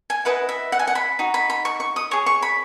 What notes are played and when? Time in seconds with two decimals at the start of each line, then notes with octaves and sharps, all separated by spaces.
0.10 G#5
0.25 E4 B4 D#5 F#5
0.49 E5
0.72 F#5
0.79 G#5
0.87 F#5
0.95 B5
1.19 D#4 F#4
1.34 B5
1.50 B5
1.65 C#6
1.80 C#6
1.96 D#6
2.11 G#4 C#5 C#6
2.26 C#6
2.42 B5